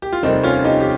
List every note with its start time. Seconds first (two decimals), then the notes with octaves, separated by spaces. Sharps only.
0.02 G4
0.12 F4
0.23 F1 D#2 D#3 G3 C4 D#4
0.43 C#4 F4
0.64 D#4 G4
0.80 G4